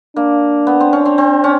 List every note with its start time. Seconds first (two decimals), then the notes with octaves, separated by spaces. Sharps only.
0.16 A#3 D4
0.67 B3
0.80 C4
0.93 C#4
1.05 C4
1.18 C4
1.44 C#4